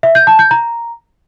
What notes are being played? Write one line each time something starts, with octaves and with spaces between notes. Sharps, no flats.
E5
G6
A5
G6
A#5